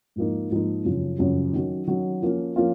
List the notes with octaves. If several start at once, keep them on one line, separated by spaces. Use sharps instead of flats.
G#2 F3 A#3 D#4
G#2 F3 A#3 D#4
F#2 C#3 F3
F#2 C#3 F3
D#3 F#3 C#4 F#4
D#3 F#3 C#4 F#4
F3 A#3 C#4 F4
F3 A#3 C#4 F4